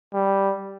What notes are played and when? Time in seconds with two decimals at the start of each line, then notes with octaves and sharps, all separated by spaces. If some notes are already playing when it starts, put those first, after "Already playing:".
0.14 G3